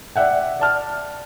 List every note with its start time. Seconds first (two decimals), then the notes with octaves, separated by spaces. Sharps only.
0.16 D5 E5 F#5 G5
0.60 D5 A5 F6